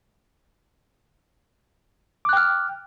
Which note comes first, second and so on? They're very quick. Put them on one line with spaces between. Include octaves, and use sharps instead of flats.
D6 F#6 G5 F6